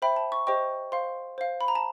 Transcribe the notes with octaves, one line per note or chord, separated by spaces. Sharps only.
C5 E5 G5 B5
A5
C#6
G4 C5 D#5 G5 C#6
C5 F5 C6
C5 F5
B5
A#5
A5